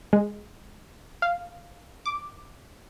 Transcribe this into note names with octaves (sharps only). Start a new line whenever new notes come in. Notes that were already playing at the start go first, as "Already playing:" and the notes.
G#3
F5
D6